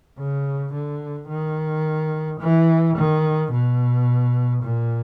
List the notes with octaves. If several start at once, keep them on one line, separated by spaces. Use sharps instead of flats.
C#3
D3
D#3
E3
D#3
B2
A#2